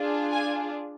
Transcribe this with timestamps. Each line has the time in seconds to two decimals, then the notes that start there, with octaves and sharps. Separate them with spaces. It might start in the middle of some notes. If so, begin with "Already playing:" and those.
Already playing: D4 F4 G#4
0.32 G#5